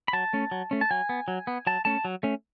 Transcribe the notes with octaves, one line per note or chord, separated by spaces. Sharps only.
B5
F#3 A5
A3 C#4
F#3
A3 C#4
A5
F#3 G#5
B3
F#3
B3
F#3 A5
A3 C#4 A5
F#3
A3 C#4